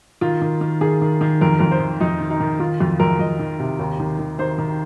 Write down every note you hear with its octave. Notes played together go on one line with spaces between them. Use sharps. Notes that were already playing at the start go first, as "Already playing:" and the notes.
D#3 F4
D#3
D#3
D#3 G#4
D#3
D#3
F2 A#4
F2 A#4
C5
D#3
F2 D#4
D#3
D#4
D#3
D#3 F4
F2 F4
F2 A#4
F2 D#5
D#3
C3
D#2
D#3
D#3
D#3 C5
D#3